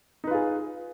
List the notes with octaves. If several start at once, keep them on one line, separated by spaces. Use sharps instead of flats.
D#4 F4 G#4 B4